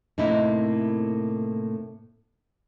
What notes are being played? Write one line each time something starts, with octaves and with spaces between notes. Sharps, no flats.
A2 C3 A#3 C4 D#4 E4